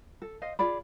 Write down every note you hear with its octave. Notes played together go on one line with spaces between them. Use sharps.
A4
C5 D#5 F5
F4 G#4 D5 B5